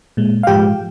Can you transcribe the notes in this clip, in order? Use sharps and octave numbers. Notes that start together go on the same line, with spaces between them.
A#2 G#3
F5
G#2 F3 G#3 G4 G5